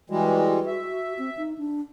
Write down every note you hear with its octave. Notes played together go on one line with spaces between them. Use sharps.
E3 G3 G#3 F#4
E5
C4
D#4
D4